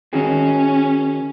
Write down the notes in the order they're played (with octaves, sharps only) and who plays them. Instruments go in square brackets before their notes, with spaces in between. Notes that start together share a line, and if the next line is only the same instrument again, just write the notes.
[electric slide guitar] D#3 F#4 G#4 [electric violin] C#4